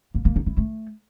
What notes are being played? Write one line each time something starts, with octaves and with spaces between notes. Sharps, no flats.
A#3
A#3
D#4
E4
A3